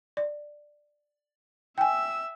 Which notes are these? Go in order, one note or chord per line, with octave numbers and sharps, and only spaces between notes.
D5
E5 G5 G#5 E6